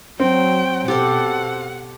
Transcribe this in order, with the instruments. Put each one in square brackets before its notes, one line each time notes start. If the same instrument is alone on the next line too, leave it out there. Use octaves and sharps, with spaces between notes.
[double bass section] F#3 [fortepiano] C4 [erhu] G5
[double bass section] B2 [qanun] G4 A4 C5 [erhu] F#5